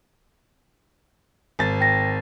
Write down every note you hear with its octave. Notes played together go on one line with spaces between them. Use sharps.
G#1 A6
G5 A#6